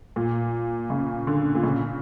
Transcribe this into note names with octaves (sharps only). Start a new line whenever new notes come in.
A#2
C#3
D3
A#2
C#3